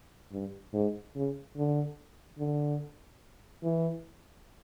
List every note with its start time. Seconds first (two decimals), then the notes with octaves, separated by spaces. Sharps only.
0.32 G2
0.73 G#2
1.16 C#3
1.57 D3
2.39 D3
3.63 E3